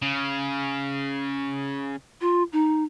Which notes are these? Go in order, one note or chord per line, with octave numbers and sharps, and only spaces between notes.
C#3
F4
D#4